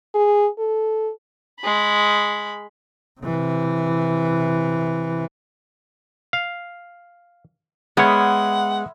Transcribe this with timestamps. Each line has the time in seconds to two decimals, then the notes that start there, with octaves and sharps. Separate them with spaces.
0.14 G#4
0.59 A4
1.61 G#3 B5
3.21 C3 E3
6.33 F5
7.97 G#3 B3 C#5 E5 F#5 B5 F6